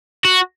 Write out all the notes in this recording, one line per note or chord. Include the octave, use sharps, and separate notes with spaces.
F#4